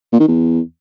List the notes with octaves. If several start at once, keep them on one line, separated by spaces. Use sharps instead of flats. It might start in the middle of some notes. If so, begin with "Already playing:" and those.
A#2
D#3
E2